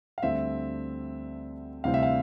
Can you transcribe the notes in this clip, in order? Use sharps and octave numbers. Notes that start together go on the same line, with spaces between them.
F5
D2 D3 G3 C4 E5
D2 C3 E3 G3 C4 F5
E5
F5